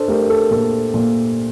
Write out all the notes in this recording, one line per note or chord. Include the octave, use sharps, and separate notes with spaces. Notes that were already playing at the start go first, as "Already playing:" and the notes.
Already playing: D4 A4 C5
A3 G4 A#4
A4
A#2 A4
A#2